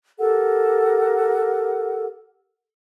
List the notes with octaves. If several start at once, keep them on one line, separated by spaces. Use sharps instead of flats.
G4 A4 A#4 F#5